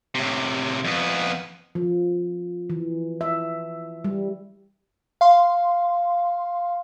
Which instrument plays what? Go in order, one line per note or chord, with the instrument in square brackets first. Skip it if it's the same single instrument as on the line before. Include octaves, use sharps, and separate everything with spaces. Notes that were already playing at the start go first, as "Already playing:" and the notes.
[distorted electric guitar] A2 C3
F2 B3
[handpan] F3
E3
E5
G3
[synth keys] F5 C6